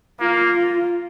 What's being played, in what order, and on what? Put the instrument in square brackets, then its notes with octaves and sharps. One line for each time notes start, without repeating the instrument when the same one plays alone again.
[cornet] A#3 [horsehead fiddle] F4